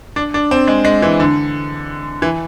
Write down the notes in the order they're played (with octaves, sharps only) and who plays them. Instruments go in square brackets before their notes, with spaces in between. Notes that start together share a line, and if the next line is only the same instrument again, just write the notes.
[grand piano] D4
D4
C4
G#3
G#3
E3
D3
E3